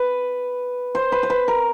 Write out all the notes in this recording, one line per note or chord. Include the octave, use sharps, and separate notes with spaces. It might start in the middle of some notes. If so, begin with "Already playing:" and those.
Already playing: B4
C5
B4
C5
B4
A#4